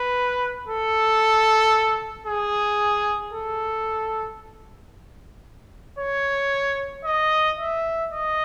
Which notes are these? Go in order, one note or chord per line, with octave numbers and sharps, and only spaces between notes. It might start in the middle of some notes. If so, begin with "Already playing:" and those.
Already playing: B4
A4
G#4
A4
C#5
D#5
E5
D#5